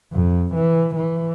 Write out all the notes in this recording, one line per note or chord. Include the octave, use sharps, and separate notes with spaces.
F2
E3
E3